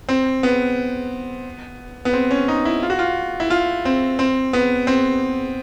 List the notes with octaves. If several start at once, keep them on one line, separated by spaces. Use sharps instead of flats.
C4
B3
B3
C4
C#4
D#4
E4
F4
F#4
F4
E4
F4
C4
C4
B3
C4